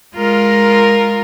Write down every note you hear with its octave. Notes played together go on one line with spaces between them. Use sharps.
G#3 F4 A#4